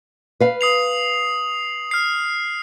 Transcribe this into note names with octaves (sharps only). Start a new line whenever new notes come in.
B4 F5
D#6 C7 F7
F6 C7